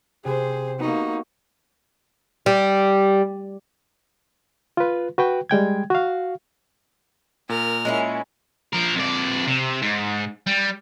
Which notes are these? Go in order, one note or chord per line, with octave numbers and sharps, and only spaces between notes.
C3 G#4 C5
A#3 B3 D#4 F#4 C#6
G3
F4 B4
F#4 B4 G5
G3 G#3 G5 G#6
F#4 F5
A#2 A#4 F6
G#3 C#4 E4
F3 A#4
F2 D5
C3
G#2
G3